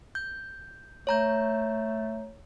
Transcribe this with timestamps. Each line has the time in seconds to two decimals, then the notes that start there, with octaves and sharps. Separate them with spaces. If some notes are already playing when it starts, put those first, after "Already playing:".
0.15 G6
1.07 A3 C#5 A#5 G6